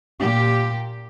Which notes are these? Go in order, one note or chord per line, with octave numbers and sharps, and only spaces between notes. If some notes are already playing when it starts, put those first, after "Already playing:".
A#2 G4